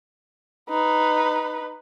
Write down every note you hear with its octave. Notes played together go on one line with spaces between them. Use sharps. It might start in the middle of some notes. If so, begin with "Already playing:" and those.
D#4 B4